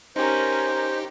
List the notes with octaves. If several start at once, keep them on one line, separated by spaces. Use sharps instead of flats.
C#4 D#4 G4 A#4 C5